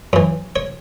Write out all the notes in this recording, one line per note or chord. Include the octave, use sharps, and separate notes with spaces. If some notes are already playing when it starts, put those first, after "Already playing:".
F#2 E3
C#5